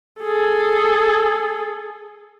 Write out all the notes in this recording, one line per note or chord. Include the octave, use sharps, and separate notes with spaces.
G#4 A4